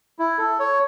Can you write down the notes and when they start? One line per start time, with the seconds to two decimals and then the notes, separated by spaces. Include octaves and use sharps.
0.19 E4
0.38 A4
0.59 C#5